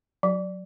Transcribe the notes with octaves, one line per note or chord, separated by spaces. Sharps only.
F#3